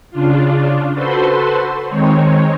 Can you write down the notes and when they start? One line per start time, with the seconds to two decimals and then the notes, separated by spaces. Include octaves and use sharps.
0.10 C#3 D4 F4
0.92 F#4 A4 B4 C5 C6
1.87 D#3 G#3 C4 D#4 C#5